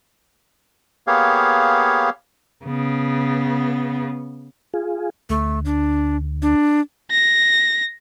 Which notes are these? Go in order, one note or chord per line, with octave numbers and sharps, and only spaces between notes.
A#3 B3 G4 G#4 C#5 F5
C#3 B3
F4 G#4
D2 A3
D4
D4
A#6